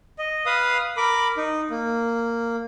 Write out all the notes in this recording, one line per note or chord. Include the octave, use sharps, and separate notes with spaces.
D#5
B4 F5 D#6
A#4 B5 D6
D#4
A#3